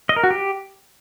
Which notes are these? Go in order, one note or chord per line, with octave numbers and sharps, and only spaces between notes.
D#5
A#4
F#4
G4